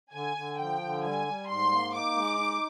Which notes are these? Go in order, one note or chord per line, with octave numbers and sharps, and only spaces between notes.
D3 G#5
D3
F3 G5
D3
G3 G#5
G3
G#2 C6
A#3
D#4 D6
G#3
D#4